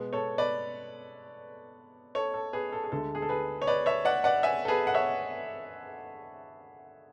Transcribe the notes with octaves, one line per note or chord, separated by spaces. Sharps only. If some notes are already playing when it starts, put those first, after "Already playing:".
Already playing: B2 G#3 B3
A4 C#5
B4 D5
A4 C#5
A4
G#4 B4
A4
G#4
D2 D3 G#3 A4
G#4
A4
G#4 B4
C#5
B4 D5
C#5 E5
D5 F#5
D5 F#5
E5 G#5
A4
G#4 B4
F#5
C#5 E5